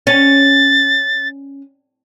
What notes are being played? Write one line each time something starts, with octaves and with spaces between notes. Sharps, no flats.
C#4 A6